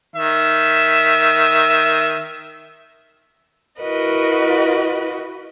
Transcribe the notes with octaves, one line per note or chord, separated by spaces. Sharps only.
D#3 E5
E4 F#4 A#4 B4 D#5